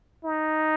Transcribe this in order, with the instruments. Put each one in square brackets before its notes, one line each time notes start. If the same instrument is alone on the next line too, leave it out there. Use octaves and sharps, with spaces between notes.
[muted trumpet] D#4